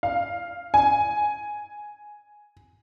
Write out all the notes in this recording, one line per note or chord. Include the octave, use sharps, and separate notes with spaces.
F5
G#5